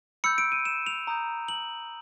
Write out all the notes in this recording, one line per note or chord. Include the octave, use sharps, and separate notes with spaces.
B5 E6 G6 C#7
D7
D#7
E7
F7
A#5 D#6 G6
F#7